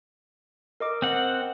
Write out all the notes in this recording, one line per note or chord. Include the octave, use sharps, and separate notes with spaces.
A#4 D#5 D6
C4 F#5